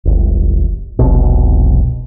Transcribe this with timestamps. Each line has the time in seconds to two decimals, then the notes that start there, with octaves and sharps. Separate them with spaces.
0.05 D1 G1
0.99 F1 C2 B2